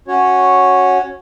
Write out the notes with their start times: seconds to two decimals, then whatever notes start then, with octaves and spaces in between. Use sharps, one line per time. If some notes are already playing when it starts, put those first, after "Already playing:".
0.08 C#4 F#4 C#5